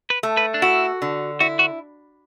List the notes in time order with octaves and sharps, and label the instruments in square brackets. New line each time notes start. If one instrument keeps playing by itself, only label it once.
[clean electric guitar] B4
[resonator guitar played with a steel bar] A3
[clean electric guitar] B4
D4
[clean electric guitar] E4 [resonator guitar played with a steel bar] F#4
[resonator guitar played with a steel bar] D3
[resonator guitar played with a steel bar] E4 [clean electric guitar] F#4
[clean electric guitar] F#4